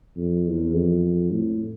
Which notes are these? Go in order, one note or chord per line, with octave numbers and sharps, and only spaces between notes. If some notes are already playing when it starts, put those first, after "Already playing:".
F2
E2
F2
A2